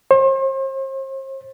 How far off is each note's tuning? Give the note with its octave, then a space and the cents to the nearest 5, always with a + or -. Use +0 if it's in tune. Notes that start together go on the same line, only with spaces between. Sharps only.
C5 +40